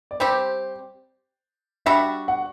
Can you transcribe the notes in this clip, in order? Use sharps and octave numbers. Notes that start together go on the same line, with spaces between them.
D5
G3 C4 G4 C5
G3 D4 F#4 E5
F#5